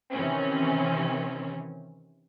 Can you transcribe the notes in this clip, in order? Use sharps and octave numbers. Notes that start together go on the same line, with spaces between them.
C3 D#3 E3 C4 C#4